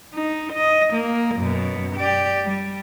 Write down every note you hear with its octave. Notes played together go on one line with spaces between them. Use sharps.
D#4
D#5
A#3
F#2 B2
G4 D5
G3